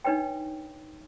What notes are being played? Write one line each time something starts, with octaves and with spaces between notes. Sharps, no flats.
D4 D#4 B4 C#5 G5